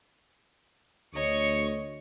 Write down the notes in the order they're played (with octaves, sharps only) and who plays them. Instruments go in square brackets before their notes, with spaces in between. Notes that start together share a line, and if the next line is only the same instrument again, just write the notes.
[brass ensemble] D2 [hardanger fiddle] C#5 D#5 [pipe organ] C#6